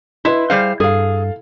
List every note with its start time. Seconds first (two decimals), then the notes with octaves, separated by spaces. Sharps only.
0.25 E4 B4 D#5 C6
0.50 G3 G#4 C5 F5
0.80 G2 G#4 A4 F5